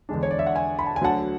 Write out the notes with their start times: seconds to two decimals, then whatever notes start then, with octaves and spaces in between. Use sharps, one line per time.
0.09 E2 D3 G#3 D4
0.23 C#5
0.31 D5
0.39 E5
0.47 F#5
0.55 E5 G#5
0.79 B5
0.86 A5
0.96 G#5
1.01 D2 D3 F#3 F#5 A5